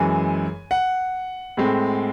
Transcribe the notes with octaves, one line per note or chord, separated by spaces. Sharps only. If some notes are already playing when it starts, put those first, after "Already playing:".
Already playing: F#2 E3 G#3 G#5
F#5
A2 G#3 C4